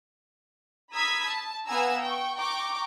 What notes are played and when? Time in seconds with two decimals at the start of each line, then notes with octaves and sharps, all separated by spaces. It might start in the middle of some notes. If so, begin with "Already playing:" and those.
0.93 A#5 B5 D#6 E6 G#6 B6
1.25 A5
1.67 B3 F5 F#5 G#5 A#5 E6
2.02 G5 C#6
2.36 G5 A#5 C#6 D6